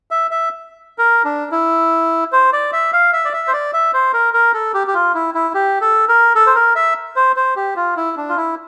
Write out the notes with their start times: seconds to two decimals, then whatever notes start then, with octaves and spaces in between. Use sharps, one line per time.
0.11 E5
0.31 E5
0.98 A#4
1.25 D4
1.52 E4
2.32 C5
2.53 D5
2.73 E5
2.93 F5
3.13 E5
3.25 D5
3.33 E5
3.48 C5
3.53 D5
3.73 E5
3.94 C5
4.13 A#4
4.34 A#4
4.54 A4
4.74 G4
4.87 G4
4.94 F4
5.15 E4
5.34 E4
5.55 G4
5.81 A4
6.09 A#4
6.35 A4
6.47 C5
6.55 A#4
6.75 E5
7.16 C5
7.36 C5
7.56 G4
7.76 F4
7.97 E4
8.17 D4
8.29 F4
8.37 E4